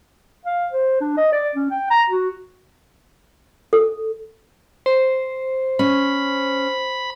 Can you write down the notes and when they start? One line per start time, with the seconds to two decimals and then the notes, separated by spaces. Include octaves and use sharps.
0.45 F5
0.72 C5
1.01 D4
1.17 D#5
1.32 D5
1.55 C#4
1.71 G5
1.90 A#5
2.09 F#4
3.73 A4
4.86 C5
5.79 C#4 B5